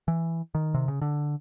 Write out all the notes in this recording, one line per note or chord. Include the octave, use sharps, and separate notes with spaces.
E3
D#3
C3
C#3
D3